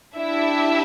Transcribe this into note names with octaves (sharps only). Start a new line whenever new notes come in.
D4 E4 G4 E5